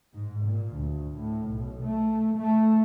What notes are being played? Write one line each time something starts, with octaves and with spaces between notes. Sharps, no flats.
G#2
A#2
D2
A2
B1
A3
A3